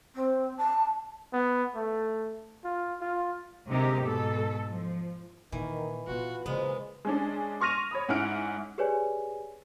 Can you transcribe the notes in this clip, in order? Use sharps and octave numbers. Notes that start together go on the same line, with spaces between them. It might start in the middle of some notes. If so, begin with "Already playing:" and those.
C4
A5
B3
A3
F4
F4
D2 C3 G#3 D#4 G4 A#4
G#2 B2 A4
F3
A#2 D#3 E3
A#2 B3 F4 F#4 B4
E2 A#2 C#3 G#3 B3 C5
G#3 C#4 D4
C6 C#6 F6 A#6 D#7 F7
C#5 B5 D#6
G#2 C#4 E4 F#5 F6 D7
G4 G#4 B4 C#5 D5 G#5